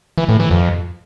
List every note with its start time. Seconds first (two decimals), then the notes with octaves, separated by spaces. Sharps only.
0.18 E3
0.29 A2
0.40 E3
0.51 F2